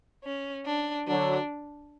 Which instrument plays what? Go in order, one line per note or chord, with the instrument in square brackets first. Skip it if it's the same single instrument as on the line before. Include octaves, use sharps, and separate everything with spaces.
[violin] C#4
D4
[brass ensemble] D3 F#3 [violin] D4